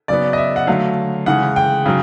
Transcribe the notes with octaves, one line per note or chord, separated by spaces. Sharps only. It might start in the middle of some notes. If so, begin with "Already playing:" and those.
C#3 F#3 B3 D5
D#5
E5
F#5
D3 F#3 A3 F5
C#3 E3 G#3 F#5
G5
C#3 F#3